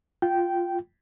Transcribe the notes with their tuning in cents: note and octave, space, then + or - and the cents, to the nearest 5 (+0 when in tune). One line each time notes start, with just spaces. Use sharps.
F4 +0 G5 -10